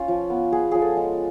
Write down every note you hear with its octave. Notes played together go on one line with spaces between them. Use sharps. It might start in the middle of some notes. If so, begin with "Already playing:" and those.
Already playing: C#4 F4 C#5
F3
B3
B3 G#4
F3 G#4
A4
G#3